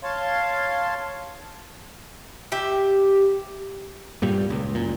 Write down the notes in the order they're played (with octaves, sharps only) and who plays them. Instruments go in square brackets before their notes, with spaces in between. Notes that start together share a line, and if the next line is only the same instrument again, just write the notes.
[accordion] C#5 F5 A5 C6
[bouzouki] G4 E5
[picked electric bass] G2 A#2 G3
C#2
F#1 A#2